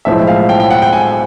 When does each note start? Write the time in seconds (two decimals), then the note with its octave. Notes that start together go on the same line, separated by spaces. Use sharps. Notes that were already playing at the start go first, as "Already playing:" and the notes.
0.05 B1 A2 F3 G#3 E5
0.27 F5
0.49 G5
0.60 G5
0.71 F#5
0.82 G5
0.93 G#5